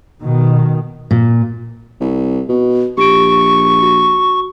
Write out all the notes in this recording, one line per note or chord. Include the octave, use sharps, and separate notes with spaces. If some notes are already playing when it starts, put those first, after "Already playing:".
B2 D#3
A#2
C2
B2
A#1 G4 C#6 D7
F#4